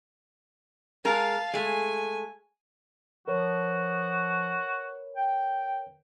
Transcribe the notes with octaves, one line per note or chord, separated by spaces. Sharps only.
G#3 A#4 F5 A5
G#3 A3 G#5
F3 F#4 A#4 B4 C#5
G5